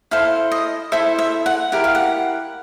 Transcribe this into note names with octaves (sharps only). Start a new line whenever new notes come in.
E4 A4 C5 F5
D#5
E4 A4 C5 E5
E5
F#5
E4 G4 A#4 F#5
F5
F#5